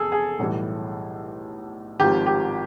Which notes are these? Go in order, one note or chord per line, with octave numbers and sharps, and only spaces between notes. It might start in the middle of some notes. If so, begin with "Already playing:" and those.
Already playing: F1 E2 G#4 A4
G#4
B1 A2 E3 G3
G#1 G#2 F3 G4
G4